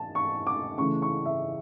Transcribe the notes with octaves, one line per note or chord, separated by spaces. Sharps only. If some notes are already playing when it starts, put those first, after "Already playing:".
Already playing: A5
C#6
D6
C#3 E3 A3 C#6
C#6
E5